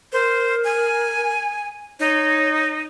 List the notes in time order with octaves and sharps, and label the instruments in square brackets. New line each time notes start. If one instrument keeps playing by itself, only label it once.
[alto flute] A#4 [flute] C5
[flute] G#5
[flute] D#4 [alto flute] C#5